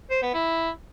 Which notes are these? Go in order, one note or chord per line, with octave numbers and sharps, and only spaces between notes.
C5
B3
E4